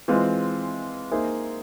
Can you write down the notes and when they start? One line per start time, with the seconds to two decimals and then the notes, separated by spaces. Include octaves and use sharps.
0.08 E3 G#3 C4 F4
1.12 A#3 D#4 G#4 C5 E5